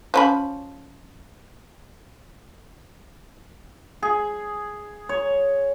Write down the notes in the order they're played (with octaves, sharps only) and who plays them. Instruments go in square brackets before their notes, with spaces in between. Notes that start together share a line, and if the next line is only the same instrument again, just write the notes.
[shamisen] F3 C#4 B5
[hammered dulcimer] G#4
C#5